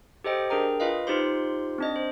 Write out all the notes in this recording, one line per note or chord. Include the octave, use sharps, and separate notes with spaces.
G4 A4 C5 D#5 G5
D4 G#4 A#4 G5 A#5
F4 B4 D#5 F5
D#4 F4 G4 C5 C6
C4 D4 D#5
C5